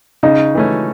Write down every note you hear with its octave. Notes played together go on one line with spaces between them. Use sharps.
C#3 D#4
E3 A3 C#4